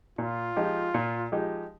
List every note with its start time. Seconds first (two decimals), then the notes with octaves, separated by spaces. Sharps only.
0.18 A#2 F4
0.56 F3 G#3 D#4 G4
0.94 A#2
1.32 F3 G#3 D#4 G4